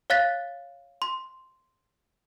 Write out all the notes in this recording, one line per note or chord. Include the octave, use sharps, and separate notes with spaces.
C#5 F5 F#6 A6 B6
C6